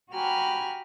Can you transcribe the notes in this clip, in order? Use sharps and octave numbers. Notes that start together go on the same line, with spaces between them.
F#4 G4 G#5 A#5 B5 F6